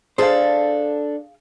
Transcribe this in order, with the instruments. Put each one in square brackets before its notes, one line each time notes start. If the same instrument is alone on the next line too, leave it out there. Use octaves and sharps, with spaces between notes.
[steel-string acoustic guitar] D4 A4 [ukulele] G#4 F5 [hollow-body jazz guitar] C5